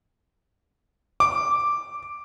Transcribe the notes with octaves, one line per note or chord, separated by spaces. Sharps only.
D6